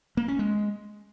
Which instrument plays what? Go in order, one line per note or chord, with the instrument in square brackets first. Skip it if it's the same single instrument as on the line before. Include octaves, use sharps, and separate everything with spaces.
[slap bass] A#3
C#4
G#3